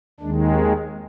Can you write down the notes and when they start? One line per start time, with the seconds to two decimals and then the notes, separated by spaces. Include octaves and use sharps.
0.20 D#2 D#3 G#3 D4
0.53 C4